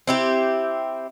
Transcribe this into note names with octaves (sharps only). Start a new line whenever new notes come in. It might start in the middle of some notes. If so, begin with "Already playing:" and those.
C4 E4 G4